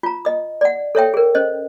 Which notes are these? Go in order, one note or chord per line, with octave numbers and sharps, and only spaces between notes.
F4 A#5
D#5 D#6
D5 F#5
A4 C#5 E5 G5
G#4 A#4
C#4 C5 D#5